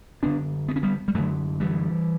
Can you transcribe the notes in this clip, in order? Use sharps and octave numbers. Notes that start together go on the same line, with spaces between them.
F#2 D3 B3 D4
B3
C#4
G3 B3
G3
F#2 D3 F#3 A3
E3 G3